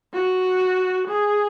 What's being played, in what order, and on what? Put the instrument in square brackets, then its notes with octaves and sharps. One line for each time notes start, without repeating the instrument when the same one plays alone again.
[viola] F#4
G#4